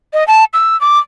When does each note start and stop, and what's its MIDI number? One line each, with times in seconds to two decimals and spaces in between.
0.13 0.26 75
0.28 0.44 81
0.54 0.79 88
0.81 0.99 86